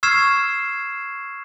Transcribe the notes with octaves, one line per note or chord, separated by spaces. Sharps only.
C#6 E6 F6 G#6 C7 E7